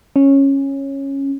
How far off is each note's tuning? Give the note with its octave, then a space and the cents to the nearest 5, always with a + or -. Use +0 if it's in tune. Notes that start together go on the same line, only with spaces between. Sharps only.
C#4 -10